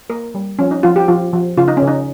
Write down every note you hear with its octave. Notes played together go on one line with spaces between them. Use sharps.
A#3 A#4
G3
F3 C#4
D#4
F3 F4
G4
F3 F4
F3
C#3 F4
D#4
C#4
C#3
D#4